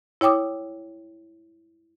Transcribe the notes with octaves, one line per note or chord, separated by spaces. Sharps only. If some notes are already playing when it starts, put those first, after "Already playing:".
E4 C#5 G5 D6 D#6